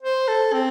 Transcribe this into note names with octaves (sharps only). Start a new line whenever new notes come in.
C5
A4
C4